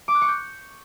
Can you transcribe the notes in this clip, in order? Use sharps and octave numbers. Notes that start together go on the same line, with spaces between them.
D6
F#6
C#6
G6